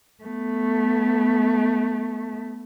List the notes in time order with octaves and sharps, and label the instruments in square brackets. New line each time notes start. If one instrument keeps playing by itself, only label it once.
[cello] A3 B3